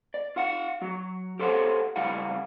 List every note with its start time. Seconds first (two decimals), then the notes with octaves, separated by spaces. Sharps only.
0.14 D5
0.36 F4 F5 F#5
0.81 F#3 F#4
1.39 G4 A4 C5 C#5 E5 F#5
1.96 C#2 G3 E4 F5 F#5